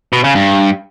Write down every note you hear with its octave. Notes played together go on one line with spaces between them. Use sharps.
B2
C#3
G2